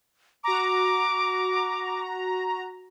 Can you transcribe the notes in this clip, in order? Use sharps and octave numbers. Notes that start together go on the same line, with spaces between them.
F#4 A#5 D6